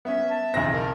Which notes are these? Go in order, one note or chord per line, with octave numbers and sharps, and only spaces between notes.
B3 C#4 E5
A5
B1 E2 C#3 C4 A#6
A#4